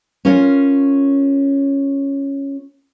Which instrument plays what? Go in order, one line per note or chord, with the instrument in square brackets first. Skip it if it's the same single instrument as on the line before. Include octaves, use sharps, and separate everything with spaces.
[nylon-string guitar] C#4 F4 A#4 C#5